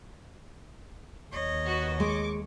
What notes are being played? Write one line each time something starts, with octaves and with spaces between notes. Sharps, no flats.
D#2 C#5 D#5
F#4 B4
G#3 C#6 D6